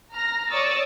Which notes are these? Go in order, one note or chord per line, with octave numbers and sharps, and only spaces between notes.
A#5 F6 A#6
C#5 D5 C#6 D#6 E6 A6